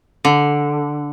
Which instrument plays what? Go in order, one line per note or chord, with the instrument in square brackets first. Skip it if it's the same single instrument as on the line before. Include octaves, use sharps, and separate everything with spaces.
[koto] D3